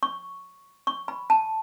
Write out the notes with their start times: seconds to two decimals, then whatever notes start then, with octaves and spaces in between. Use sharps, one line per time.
0.03 C#6
0.87 C#6
1.08 B5
1.30 A5